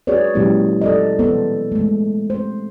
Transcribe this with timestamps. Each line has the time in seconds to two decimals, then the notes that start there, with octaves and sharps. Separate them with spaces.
0.07 F#4 G#4 B4 C#5 D5
0.35 A#2 F#3 G#3 C#4 E4 G4
0.81 A4 D5 D#5
1.19 E3 G3 B3 A4 C5
1.72 G#3 A3
2.30 C5